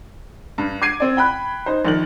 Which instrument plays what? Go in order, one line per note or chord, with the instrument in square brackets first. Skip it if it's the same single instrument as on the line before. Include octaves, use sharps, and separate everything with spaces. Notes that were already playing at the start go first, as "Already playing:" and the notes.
[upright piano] G2
D6 G#6 C7 D#7
C4 D5
G5 B5 F#6
D#4 C5
A#1 D#3 F#7